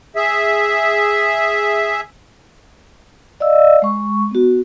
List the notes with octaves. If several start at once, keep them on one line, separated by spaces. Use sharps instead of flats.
G#4 E5
D5 D#5 F5 E6
G#3 C#6
B3 F#4